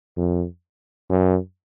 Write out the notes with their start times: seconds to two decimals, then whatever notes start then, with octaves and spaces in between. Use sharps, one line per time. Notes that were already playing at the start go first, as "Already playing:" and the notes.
0.17 F2
1.09 F#2